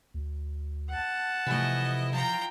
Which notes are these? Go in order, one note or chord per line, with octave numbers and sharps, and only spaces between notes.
D2
F#5 A5
C3 E3 F3 A3 E4 D#5
F3 F4 G5 A#5